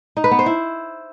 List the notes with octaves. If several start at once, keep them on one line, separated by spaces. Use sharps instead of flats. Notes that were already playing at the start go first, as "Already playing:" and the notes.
D#4
B4
B3
C5
E4